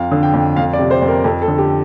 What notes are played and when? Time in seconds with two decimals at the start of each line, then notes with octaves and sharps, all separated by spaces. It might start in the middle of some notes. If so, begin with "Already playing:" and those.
Already playing: F2 F5
0.11 D3
0.23 G5
0.34 F2
0.56 F2 F5
0.73 D5
0.79 C3
0.91 C5
1.02 F2
1.08 A#4
1.24 F2 A4
1.42 A4
1.48 D3
1.58 G4